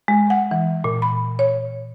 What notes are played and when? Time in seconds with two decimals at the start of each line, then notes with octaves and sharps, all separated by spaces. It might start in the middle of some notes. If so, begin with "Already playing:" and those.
0.08 G#3
0.30 F#5
0.51 E3
0.84 A#2
1.02 B5
1.39 C#5